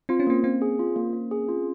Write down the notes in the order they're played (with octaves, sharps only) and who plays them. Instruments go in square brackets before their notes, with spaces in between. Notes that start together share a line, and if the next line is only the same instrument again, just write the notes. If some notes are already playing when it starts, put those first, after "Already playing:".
[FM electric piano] C4 [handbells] F4
[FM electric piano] C#4
[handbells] A#3 [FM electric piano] C4
[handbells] A#3 [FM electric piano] C4
[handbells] G#4
F4
A#3
A#3
G#4
F4